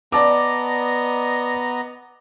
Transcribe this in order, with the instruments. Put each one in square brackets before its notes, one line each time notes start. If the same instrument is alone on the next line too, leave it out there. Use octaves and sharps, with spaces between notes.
[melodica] B3 D#5 A#5 [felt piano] D5 A5 D6